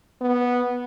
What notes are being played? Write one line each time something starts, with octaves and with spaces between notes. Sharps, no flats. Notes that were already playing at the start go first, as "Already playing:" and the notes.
B3